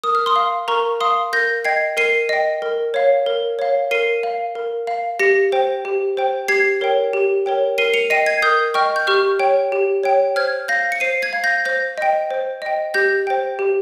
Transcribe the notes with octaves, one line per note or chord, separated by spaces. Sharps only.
A#4 D#6
F6
C6 D#6
F5
A#4 A#5 C#6
F5 C6 D#6
A#4 G6 A#6
D#5 G5 G#6 C7
A#4 C7 D#7
D#5 G5
A#4
C#5 F5
A#4
C#5 F5
A#4 C7 D#7
F5
A#4
F5
G4 A#6 C#7
C5 G5
G4
C5 G5
G4 G#6 C7
A#4 C#5 G5
G4
A#4 C#5 G5
A#4 C7 D#7
C#7 F7
D#5 G5 C7 D#7
G#6 C7
A#4 D#6 G6
D#5 G5 C#6 F6
G6
G4 C#6 F6
C#5 G5
G4
C#5 G5
C5 F6 G#6
F5 G6 A#6
C#7
C5 C7 D#7
G#6 C7
F5
G6 A#6
C5 G6 A#6
D#5 G5
C5
D#5 G5
G4 G6 A#6
C5 G5
G4